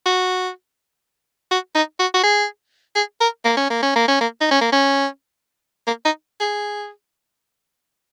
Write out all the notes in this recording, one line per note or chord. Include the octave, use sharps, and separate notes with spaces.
F#4
F#4
D#4
F#4
F#4
G#4
G#4
A#4
A#3
C#4
A#3
C#4
A#3
C#4
A#3
D#4
C#4
A#3
C#4
A#3
D#4
G#4